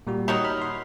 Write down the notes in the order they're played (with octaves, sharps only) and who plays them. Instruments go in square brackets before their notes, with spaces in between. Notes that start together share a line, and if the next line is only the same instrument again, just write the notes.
[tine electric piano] A#2 G3 F#4
[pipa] D#3 F#3 D#4
[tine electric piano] B5 F6
C6